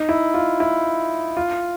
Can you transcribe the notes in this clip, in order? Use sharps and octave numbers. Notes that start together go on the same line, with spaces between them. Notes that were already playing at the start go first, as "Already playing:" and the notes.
Already playing: D#4
E4
F4
E4
F4